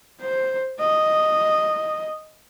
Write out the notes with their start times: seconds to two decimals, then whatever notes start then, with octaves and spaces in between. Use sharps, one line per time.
0.21 C5
0.79 D#5